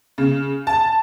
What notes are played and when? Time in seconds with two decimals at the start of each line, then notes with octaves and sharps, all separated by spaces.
0.18 C#3
0.67 A5